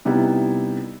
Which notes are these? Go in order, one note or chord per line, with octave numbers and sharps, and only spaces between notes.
C3 G3 B3 D#4 E4